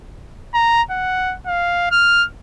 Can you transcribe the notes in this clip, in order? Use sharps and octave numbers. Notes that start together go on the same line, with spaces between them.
A#5
F#5
F5
F6